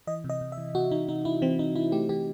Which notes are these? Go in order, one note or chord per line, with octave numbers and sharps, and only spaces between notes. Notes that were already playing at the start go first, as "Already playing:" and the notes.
E3 D#5
C3
D#5
C3
E5
E3
C3 F#4
E3 D#4
C3 D#4
C3 E4
E3 C4
C3 D#4
E3 E4
A3 G4
E3 G4